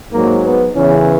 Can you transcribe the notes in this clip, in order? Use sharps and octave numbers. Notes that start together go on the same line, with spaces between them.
G#2 F#3 A#3
B3
E2 C#3 E3 C#4